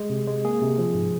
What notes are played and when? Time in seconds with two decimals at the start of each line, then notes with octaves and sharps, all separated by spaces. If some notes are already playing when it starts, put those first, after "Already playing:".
Already playing: G#3
0.10 C3
0.27 G#3
0.45 A#3 G#4
0.62 C3
0.78 F3
0.94 G#2